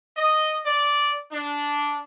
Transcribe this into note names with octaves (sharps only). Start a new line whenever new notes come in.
D#5
D5
D4